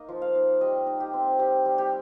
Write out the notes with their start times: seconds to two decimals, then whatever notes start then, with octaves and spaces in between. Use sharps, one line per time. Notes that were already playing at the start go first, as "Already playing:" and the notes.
Already playing: A#3 D#4 D#5
0.08 F3
0.22 F5
0.35 D#4
0.61 G3 D#5
0.87 D#4
1.00 G4
1.13 C4
1.39 G3 G4
1.65 G3
1.78 G4